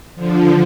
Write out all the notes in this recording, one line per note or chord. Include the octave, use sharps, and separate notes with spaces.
D3 F3